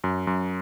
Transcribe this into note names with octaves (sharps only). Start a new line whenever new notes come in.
F#2
F#2